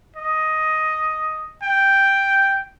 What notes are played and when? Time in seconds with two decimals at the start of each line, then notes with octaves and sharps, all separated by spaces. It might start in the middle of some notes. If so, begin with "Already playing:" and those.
0.16 D#5
1.63 G5